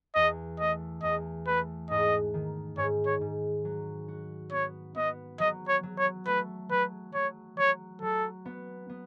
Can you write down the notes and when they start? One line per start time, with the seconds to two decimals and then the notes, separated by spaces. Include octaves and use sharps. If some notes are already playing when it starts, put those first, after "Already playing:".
0.15 E2 D#5
0.60 A3 D#5
1.03 E2 D#5
1.47 A3 B4
1.90 G#2 D#5
2.34 D#3
2.77 G#2 C#5
3.06 C#5
3.21 G#2
3.65 F#3
4.08 F#4
4.52 B3 C#5
4.96 B3 D#5
5.40 F#3 D#5
5.69 C#5
5.83 F#3
5.98 C#5
6.27 A3 B4
6.71 F#3 B4
7.14 F#3 C#5
7.58 F#3 C#5
8.02 F#3 A4
8.45 B3
8.89 B3